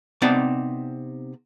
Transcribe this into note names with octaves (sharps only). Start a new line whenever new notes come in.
C3 B3 C4 D#4 D5 A5